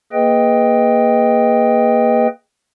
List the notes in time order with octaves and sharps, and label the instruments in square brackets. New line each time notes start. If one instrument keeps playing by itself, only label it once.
[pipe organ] A#3 G#4 B4 D#5 G5